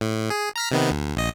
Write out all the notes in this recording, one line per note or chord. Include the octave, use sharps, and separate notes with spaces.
A2
G#4
A#5 F6 B6
C3 D#3 B3
D2
A#1 D#5